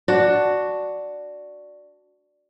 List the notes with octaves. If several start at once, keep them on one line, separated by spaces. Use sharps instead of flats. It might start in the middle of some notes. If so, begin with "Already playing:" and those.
D4 F#4